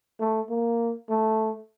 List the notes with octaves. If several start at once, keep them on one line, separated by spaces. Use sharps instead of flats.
A3
A#3
A3